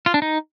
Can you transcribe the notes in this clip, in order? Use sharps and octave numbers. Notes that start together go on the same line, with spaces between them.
F4
D4
D#4